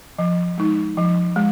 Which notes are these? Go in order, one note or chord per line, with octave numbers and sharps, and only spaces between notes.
F3
G#3 D#4
F3
G#3